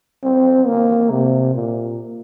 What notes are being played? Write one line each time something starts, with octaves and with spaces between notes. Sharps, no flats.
C4
A#3
C3
A#2